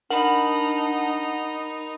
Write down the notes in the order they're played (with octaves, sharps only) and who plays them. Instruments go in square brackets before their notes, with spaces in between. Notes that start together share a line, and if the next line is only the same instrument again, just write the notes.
[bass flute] D4 [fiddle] D#4 [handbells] A#4 B5 [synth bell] F#5